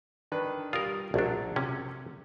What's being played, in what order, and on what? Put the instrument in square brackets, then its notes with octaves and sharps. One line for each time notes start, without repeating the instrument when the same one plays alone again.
[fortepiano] D#3 D4 B4
[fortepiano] G3 D#6 [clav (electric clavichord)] F4 A#4
[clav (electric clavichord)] A#1 D4 [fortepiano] F3 F#3 A3
[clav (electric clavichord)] C3 C#4